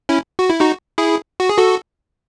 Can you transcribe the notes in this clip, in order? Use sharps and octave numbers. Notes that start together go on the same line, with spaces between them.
C#4 E4
F#4
E4
D#4 F#4
E4 G#4
F#4
G#4
F#4 A4